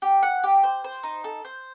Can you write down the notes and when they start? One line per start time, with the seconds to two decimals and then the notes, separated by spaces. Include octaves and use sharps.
0.02 G4
0.23 F#5
0.44 G4
0.63 C5
0.84 C5
1.03 D#4
1.24 A4
1.45 C5